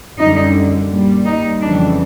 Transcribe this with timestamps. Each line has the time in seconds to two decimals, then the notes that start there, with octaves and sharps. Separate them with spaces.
0.19 F#2 D3 G3 D#4
0.90 A#2 G3
1.25 D#4
1.61 F2 C#3 E3 G3 D4